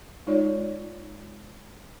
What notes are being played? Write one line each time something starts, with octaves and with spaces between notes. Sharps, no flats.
G#3 D#4 F4 C#5 D5